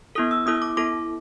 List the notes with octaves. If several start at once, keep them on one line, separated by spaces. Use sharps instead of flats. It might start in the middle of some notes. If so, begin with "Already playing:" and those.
B3 E4 A4 D#6
E6
B3 E4 A4 D#6
D6
B3 E4 A4 D6